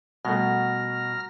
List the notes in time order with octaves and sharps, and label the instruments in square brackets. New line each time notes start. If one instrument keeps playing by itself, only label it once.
[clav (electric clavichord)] B2 [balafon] G3 A3 A4 [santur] F#4 A#4 [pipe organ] F6 A#6